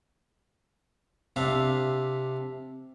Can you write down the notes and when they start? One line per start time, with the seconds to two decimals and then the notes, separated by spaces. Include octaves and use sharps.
1.36 C3 D4 E5 F5